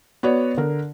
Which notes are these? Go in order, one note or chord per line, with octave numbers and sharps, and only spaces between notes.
B3 F#4 C#5 D5
D3 A#4